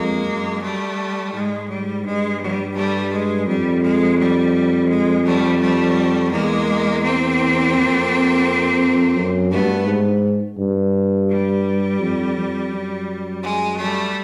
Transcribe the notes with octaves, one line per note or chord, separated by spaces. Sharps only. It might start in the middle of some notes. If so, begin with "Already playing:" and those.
Already playing: F2 G#3 A#3
F#2
G3 A3
G#2 G#3
G3
G2 G#3
G3
G3 A3
G#3
F2 G3
G#3
G3
G#3
G3 A3
G3 A3
E2 G#3 A#3
A#3 C4
F2
F#2
G2 A3 B3
G#2
G2
G3
F2
F2
F#2
G#3
G3 A3